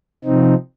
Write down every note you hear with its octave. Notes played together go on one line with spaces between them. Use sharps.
C3 F3 C4 D#4